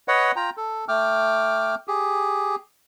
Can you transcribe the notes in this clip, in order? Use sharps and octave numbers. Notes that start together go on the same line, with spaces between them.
B4 C#5 D#5 F#5
F4 G5 A#5
A4
A3 G5 D6 F6
G4 G#4